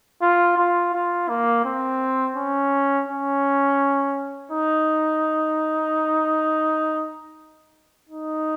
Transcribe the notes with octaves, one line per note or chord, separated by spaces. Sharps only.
F4
F4
F4
A#3
C4
C#4
C#4
D#4
D#4